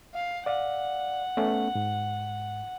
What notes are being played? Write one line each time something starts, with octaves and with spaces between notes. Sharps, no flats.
F5
D5 F5 F#5
A3 B3 C#4
G#2